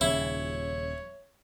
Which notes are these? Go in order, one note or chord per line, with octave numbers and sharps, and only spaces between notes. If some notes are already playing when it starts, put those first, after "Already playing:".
D#1 C#3 E4 C#5